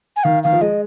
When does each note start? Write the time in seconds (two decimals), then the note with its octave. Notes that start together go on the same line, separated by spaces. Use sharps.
0.16 G#5
0.24 D#3 F5
0.43 D#3 F5
0.52 F3
0.61 G#3 D#5